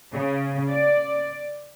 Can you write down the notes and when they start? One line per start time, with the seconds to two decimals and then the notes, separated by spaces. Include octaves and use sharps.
0.14 C#3
0.72 D5